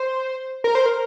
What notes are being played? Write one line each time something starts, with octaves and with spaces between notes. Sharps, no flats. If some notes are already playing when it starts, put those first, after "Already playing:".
Already playing: C5
A#4
C5
A#4